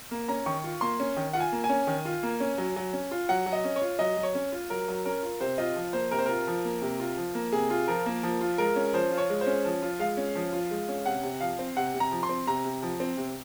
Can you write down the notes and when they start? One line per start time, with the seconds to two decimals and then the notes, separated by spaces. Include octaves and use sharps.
0.11 A#3
0.28 C#4 A#5
0.46 D#3 C#6
0.64 F4
0.81 A#3 C6
1.00 C#4
1.17 D#3
1.33 F4 F#5
1.40 G#5
1.52 A#3
1.64 G#5
1.69 C#4
1.87 D#3
2.05 F4
2.23 A#3
2.40 C#4
2.58 F#3
2.76 F#3
2.93 C#4
3.11 F4
3.29 F#3 F#5
3.46 F#3
3.53 D#5
3.65 C#4
3.76 C#5
3.82 F4
3.99 F#3 D#5
4.17 F#3
4.23 C#5
4.35 C#4
4.52 F4
4.70 F#3 A#4
4.88 F#3
5.05 C#4 A#4
5.23 F4
5.40 C3 C5
5.58 F4 D#5
5.76 F3
5.93 A#3 C5
6.11 C3 A#4
6.19 C5
6.26 F4 A#4
6.47 F3
6.65 A#3
6.82 C3
7.00 F4
7.17 F3
7.35 A#3
7.52 C3 G#4
7.70 F4
7.88 F3 A#4
8.06 A#3
8.23 F3
8.41 F4
8.58 G#3 A#4
8.76 C#4
8.93 F3 C5
9.11 F4
9.18 C#5
9.30 G#3
9.41 C5
9.47 C#4
9.65 F3
9.82 F4
9.99 G#3 F5
10.17 C#4
10.35 F3
10.53 F4
10.71 G#3
10.88 C#4
11.06 C3 F#5
11.23 C3
11.41 F3 F5
11.59 C4
11.76 C3 F#5
11.94 C3
12.00 A#5
12.12 F3
12.23 C6
12.29 C4
12.47 C3 A#5
12.65 C3
12.82 F3
13.00 C4
13.17 C3